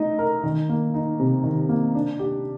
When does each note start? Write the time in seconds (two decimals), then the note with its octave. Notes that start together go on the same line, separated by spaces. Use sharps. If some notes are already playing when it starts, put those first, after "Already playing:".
Already playing: A3 D#4 D#5
0.19 A#4
0.44 D#3
0.69 A#3
0.94 D#4
1.19 C3
1.44 D#3
1.69 A#3
1.95 D4
2.19 G4